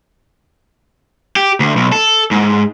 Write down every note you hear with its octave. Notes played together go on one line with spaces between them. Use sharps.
G4
D2
B1
A4
G#2